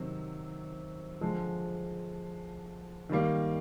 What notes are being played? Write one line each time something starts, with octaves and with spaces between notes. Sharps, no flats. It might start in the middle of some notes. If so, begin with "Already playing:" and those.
Already playing: C3 D#3 F#3
D3 F3 G#3
D#3 G3 A#3